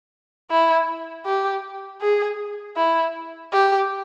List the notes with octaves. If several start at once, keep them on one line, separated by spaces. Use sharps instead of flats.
E4
G4
G#4
E4
G4